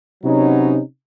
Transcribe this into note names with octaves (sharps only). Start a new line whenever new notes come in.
C3 F#3 B3 C#4 D#4